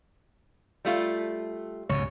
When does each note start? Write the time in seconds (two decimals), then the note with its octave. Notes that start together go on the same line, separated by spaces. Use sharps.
0.85 G3 A3 F4
1.89 C#2 G#2 B2 C#5